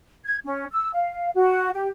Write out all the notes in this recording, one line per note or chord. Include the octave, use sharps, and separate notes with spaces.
G#6
C#4
E6
F5
F#4
G4